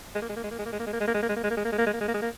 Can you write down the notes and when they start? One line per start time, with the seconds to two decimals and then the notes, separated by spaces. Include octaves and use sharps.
0.15 G#3
0.22 A#3
0.29 G#3
0.36 A#3
0.44 G#3
0.51 A#3
0.59 G#3
0.66 A#3
0.73 G#3
0.80 A#3
0.87 G#3
0.93 A#3
1.00 G#3
1.07 A#3
1.14 G#3
1.23 A#3
1.29 G#3
1.36 A#3
1.43 G#3
1.50 A#3
1.57 G#3
1.65 A#3
1.72 G#3
1.78 A#3
1.87 G#3
1.93 A#3
2.01 G#3
2.08 A#3
2.14 G#3
2.22 A#3